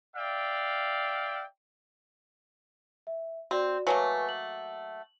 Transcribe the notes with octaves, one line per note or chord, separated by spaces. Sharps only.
D5 E5 F5 G5
E5
C4 F#4 D5
F#3 A3 A#3 B4 G#5 C#6
F#7